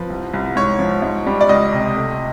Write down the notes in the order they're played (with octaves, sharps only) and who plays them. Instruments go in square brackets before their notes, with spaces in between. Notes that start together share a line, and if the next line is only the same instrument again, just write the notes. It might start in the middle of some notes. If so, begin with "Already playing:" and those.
Already playing: [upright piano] F3 B4
C2
C2
G#2 C#5
F3
G#2
G3
D5
C#2 D#5
C3
A3